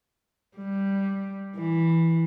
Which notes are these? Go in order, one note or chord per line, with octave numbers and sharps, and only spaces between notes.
G3
E3